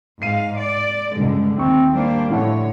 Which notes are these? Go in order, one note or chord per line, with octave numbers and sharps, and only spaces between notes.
G#2 F5 C7 D#7
D5
C#2 G2 D3 G3 G#3
D#2 A3 C4 D#4 C#6
G3 A#3 D4 C5
A2 D3 F3 E4 C#5 F#5